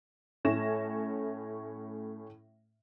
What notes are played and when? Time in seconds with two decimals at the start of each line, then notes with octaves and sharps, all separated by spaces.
0.45 A2 A3 C#4 C#5 A#6 E7